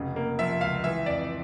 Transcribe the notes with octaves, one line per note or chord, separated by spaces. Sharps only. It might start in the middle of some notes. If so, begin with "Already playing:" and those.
Already playing: F1 C#3
A#3
F3 E5
C#2 F5
E3 E5
F2 D5